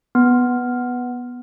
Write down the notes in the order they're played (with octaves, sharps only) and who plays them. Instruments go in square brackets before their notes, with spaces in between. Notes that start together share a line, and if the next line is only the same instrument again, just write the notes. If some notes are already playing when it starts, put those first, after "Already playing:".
[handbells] B3